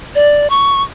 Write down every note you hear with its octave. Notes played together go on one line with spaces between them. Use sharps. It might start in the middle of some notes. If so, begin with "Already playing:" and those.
D5
C#6